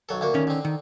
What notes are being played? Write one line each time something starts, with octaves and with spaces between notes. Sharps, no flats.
B1 F#3 A4
D2 A#3 F#4
D#3 C#4
D3 C4
D#3